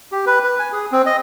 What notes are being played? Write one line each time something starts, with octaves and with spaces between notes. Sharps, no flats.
G4
B4
B4
G#5
G#4
C4
D#5